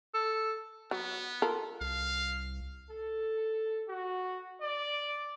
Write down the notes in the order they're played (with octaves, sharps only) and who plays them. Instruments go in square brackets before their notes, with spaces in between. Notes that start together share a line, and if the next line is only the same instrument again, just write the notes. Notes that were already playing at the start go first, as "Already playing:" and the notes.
[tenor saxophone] A4
[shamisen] F#3 [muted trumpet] B3
[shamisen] F4 A4 A#4
[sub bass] C2 [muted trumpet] F5
[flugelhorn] A4
F#4
D5